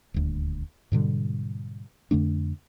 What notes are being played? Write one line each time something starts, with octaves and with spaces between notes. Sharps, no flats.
D#1 D2
G#2 B2 D3 G3
F2 D3 A3 D4